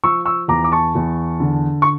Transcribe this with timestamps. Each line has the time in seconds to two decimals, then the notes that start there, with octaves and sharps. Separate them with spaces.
0.03 F3 C#6 E6
0.25 C#6 E6
0.48 E2 A#5 D6
0.64 D6
0.72 A5 C#6
0.95 E2
1.40 D3
1.82 C#6